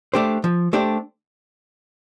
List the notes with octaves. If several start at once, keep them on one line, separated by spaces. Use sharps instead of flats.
A3 D4 G4 C5
F3
A3 D4 G4 C5